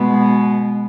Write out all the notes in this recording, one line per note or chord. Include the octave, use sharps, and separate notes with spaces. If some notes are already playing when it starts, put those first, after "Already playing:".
Already playing: B2 G#3 B3